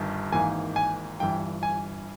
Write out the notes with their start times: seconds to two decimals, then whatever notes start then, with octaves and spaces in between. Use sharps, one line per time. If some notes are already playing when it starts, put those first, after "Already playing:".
Already playing: G1 G2 D#3
0.32 G#1 G#2 E3 A#3 G#5
0.76 G#5
1.20 G1 G2 E3 G5
1.63 G#5